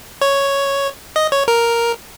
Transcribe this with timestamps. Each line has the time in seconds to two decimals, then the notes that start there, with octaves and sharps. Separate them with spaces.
0.21 C#5
1.16 D#5
1.32 C#5
1.48 A#4